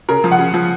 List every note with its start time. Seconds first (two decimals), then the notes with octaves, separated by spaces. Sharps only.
0.09 C#3 A#4
0.24 F3
0.32 F#5
0.39 C#3
0.54 F3